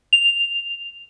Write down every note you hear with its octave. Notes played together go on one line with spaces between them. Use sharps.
F7